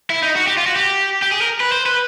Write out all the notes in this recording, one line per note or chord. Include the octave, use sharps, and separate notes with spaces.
E4
D#4
F#4
G4
F4
F#4
G4
G4
G#4
A#4
B4
C5
B4